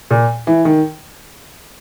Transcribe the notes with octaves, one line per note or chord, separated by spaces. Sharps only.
A#2
E3
D#3